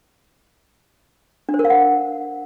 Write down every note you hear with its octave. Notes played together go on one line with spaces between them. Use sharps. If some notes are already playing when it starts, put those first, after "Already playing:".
D4
C5
A#4
F5
F#5